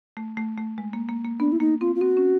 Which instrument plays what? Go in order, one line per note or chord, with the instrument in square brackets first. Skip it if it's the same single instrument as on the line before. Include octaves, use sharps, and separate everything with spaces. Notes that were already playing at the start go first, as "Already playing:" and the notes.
[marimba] A3
A3
A3
G#3
A#3
A#3
A#3
[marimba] B3 [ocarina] D4
[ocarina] E4
[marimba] A#3 [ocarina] D#4
[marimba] C4 [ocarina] F4
[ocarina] F4
[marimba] C4 [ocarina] F#4
[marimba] C#4